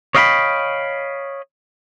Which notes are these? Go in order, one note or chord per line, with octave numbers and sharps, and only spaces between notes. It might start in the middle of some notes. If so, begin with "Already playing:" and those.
C#5 D#5 F5 G5 A#5 B5